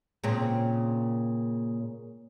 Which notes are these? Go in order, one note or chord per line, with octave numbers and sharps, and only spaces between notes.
A#2 C#3 C4